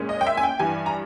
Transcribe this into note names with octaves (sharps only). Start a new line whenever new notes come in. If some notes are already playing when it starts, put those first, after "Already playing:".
Already playing: A#2 G#3 C#4
D#5
G5
E5
G#5
G5
G2 E3 G3 G#5
A#5